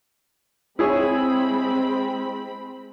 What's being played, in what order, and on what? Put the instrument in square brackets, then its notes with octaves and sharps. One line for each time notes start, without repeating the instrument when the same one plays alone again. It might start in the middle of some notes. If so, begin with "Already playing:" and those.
[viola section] G#3 C4 B5 [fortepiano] E4 G#4 C#5